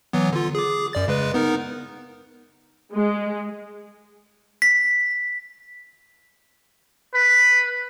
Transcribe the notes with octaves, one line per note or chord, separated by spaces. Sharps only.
E3 F#3 B3
D3 F4
G#4 D6
F#2 D5 A6
C#3 G#3 B4
B3 D#4 A#4
G#3
B6
B4